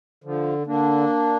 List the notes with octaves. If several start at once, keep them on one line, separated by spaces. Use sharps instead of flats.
D3 F3
D3 A#3 D4